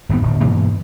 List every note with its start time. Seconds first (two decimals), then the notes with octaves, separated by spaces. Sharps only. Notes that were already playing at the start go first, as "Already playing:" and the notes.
0.09 G#1 G2 G3 B3
0.22 D1
0.40 G2 B2 E3 A#3